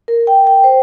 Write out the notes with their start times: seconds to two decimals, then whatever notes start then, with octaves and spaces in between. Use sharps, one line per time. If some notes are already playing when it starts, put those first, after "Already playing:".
0.08 A#4
0.27 G5
0.47 G5
0.64 C5